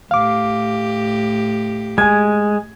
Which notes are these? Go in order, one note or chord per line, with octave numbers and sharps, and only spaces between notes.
A2 G4 F5 D6
G#3 G#5 G#6